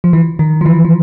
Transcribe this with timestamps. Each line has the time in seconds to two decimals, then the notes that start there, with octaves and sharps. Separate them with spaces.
0.04 F3
0.13 E3
0.39 D#3
0.61 F3
0.66 E3
0.85 F3